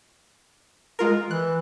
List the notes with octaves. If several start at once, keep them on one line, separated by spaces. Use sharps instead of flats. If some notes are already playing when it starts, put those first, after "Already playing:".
G#3 F4 A#4
E3 F#6